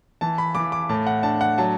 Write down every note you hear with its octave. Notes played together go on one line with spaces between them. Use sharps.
E3 A5
B5
E3 D6
D6
A2 A5
F#5
D4 A5
F#5
F#3 A5